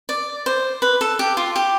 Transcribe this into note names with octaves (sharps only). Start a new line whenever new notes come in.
D5
C5
B4
A4
G4
F4
G4